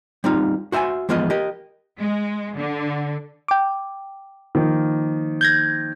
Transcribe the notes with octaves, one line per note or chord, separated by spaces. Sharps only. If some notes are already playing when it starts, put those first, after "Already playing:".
G3 C4 D#4 F4
F#4 C5 E5 F#5 G#5
E3 F3 G#3 B3 F4 D#5
G4 A#4 D#5
G#3
D3
G5 D6
D#3 F3 A#3
G6 G#6 A#6